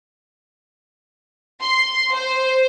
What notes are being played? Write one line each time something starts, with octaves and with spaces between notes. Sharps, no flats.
C6
C5